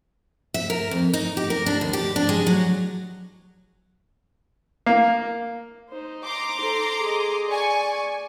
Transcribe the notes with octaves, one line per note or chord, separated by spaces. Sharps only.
E5
A#4
F2
D#4
G4
A#4
D4
D#2
G4
D4
G#3
F#3
A#3
D#4 C5
A#5 C6 D6
A4 C5
G#4 D#5
D5 G#5 C#6